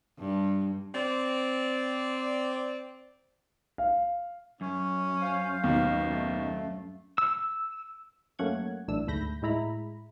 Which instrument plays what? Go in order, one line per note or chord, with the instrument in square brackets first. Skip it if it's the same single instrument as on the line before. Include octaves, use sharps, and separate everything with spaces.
[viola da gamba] G2
[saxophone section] C4 D5
[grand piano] F5
[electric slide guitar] F#2 [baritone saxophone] C#4
[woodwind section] C5 F5
[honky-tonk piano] D#2 B2
[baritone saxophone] A3
[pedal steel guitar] E6
[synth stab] F#2 A3 A#3 C#4 F#5 G#6
A#1 F#2 A2 E3 D4 E6
D2 G#2 A3 B5 G6 A#6
A2 G#3 E4 A#5 B5